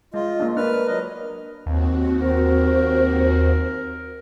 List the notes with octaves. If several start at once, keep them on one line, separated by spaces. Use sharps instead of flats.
G#3 F4 D#5
A#3 D4
D4 A#4 B4 F6
F#3 D#5
D#2 C4 F#4
A#4 C5